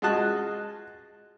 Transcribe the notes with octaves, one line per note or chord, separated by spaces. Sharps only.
G#3 F4 F#4 D#5 A5 F#6